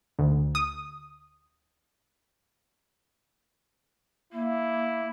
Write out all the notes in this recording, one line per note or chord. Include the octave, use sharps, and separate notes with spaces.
D2
D#6
A#3 E4